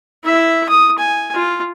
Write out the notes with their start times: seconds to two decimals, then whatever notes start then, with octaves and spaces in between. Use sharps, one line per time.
0.24 E4 E5
0.69 D#6
0.99 G#5
1.34 F4